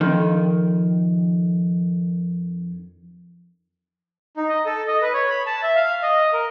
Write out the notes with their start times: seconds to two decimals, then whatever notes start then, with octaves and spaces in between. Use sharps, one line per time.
0.01 F2 D#3
4.37 D#4
4.49 D#5
4.66 A4
4.87 D#5
5.02 B4
5.14 C#5
5.30 B5
5.47 A5
5.63 E5
5.76 F5
6.03 D#5
6.33 A#4